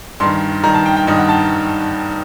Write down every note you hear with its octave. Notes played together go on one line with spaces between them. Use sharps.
G2 D#3 C6
G2 D#3 A#5
A5
G5
G5
G2 D#3 D#5
F#5
A5